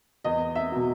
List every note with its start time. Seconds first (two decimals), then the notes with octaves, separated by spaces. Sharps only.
0.24 E2 D#5
0.55 E5
0.71 B2 F#3